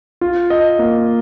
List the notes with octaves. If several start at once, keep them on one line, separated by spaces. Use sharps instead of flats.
F4
D#5
A#3